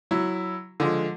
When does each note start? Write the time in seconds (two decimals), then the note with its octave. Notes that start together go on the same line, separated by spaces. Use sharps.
0.11 F#3 E4
0.80 D3 F3 G#3